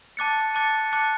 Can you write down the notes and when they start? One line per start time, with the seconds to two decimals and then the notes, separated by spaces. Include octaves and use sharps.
0.17 A5 D6 F#6 A6 C#7
0.55 A5 D6 F#6 A6 C#7
0.92 A5 D6 F#6 A6 C#7